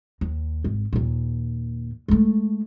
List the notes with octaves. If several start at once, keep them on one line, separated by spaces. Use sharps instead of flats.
D#2
G#1
D#2 A#2
G#3 A3